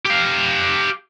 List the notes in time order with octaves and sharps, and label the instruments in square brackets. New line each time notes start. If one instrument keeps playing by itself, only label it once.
[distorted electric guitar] G4 F5